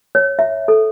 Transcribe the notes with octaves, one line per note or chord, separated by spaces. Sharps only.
C#5
E5
A4